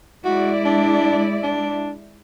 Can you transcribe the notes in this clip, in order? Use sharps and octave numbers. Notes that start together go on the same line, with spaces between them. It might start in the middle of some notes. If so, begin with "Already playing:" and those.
G#3 E4 F#4 D5
D4
D4